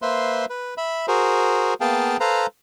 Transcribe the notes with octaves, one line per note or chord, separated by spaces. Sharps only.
A#3 B4 C5 E5 C6
B4
E5 B5
F#4 G#4 A#4 C5
A#3 B3 G#4 F5 G5 A5
A4 B4 C5 F5 A#5